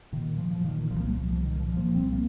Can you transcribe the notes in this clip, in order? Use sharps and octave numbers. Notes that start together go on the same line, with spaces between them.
A#2 D#3
A#2 F3
F3
A#2 D#3
D#3
C2 F3
A#3
G3
C2 F3
F3
A#2 D#3
F3
A#2
F3 A#3
C2 G3 C4
A#3